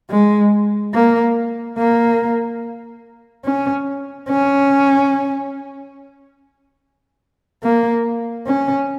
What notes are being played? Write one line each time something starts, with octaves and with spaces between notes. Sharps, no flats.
G#3
A#3
A#3
C#4
C#4
A#3
C#4